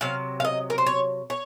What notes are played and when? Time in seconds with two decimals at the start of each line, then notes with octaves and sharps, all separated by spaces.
0.01 C3 F#3 F5
0.40 F5
0.45 D#5
0.70 A#4
0.78 C5
0.87 C#5
1.30 C#5